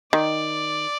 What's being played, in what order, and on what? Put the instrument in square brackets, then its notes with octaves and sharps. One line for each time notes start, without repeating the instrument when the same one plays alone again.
[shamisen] D#3 [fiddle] D5